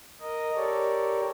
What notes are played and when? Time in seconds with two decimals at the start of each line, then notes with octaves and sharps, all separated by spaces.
0.21 A#4 D#5
0.55 G4 A4 A#4 C#5 D5